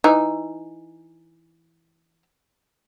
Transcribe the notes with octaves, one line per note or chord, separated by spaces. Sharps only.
E3 D#4